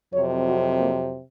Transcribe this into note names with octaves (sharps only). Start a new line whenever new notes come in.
F2 C3 F#3 C#5
F#4
A#3